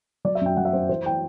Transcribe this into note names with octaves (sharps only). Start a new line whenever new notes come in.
F#3 D5
E5
F#2 G5
F#3 F#5
E5
F#2 C5
E3 C5
E3 G5